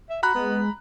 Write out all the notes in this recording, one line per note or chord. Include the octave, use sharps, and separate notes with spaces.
E5
F#4 A#5 B5 F#6
G#3 B3